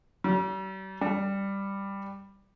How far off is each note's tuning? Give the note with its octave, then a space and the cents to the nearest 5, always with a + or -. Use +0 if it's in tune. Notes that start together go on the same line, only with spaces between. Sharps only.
G3 -45
G3 +5